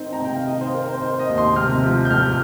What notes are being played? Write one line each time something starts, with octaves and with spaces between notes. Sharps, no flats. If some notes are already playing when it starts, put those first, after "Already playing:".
Already playing: D#3 C4 D#4 C5
A#5
C3 G5
F5
D#3 D#5
C5
C4 A#4
C5
D#4 C5
D#5
D#2
C6
C3 F6
F3
G6
F2 F6